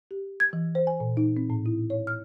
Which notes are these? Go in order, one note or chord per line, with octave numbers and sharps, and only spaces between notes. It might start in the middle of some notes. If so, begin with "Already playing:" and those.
G4
G#6
E3
C5
G#5
A#2
D#4
C4
A2
E4
C#5
F6